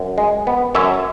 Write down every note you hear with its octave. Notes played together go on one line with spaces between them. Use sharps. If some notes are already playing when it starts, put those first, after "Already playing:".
Already playing: F#2
G#3
B3
F#2 C#5 E5